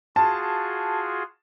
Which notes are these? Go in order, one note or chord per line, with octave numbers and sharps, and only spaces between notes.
F4 F#4 G#4 A5